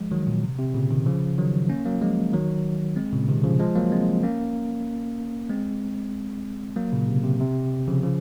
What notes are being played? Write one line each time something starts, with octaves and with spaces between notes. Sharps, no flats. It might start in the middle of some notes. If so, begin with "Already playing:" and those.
Already playing: F3 G#3
D#3 F#3
A#2
C3
C3
A#2 C#3
C3 D#3
C#3 F3
D#3 F#3
A#3 C#4
F#3 A#3
F3 G#3
D#3 F#3
G#3 C4
A#2 C#3
C3 D#3
C#3 F3
F3 G#3
F#3 A#3
G#3 C4
A#3 C#4
G#3 C4
F#3 A#3
A#2 C#3
C3
C3
C3
C#3 F3
C#3 F3